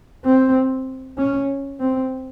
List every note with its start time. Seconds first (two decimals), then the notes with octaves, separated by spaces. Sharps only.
0.24 C4
1.18 C#4
1.80 C4